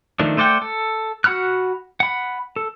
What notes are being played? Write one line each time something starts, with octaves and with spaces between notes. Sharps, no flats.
D#3 F3 A3 D4
A3 C5 D5 F#5 G5
A4
F#4 F#5 B5 F6 F#6
F#5 B5
A4